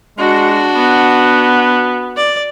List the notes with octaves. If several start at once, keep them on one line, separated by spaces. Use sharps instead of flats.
G#3 D4 F#4
B3
D5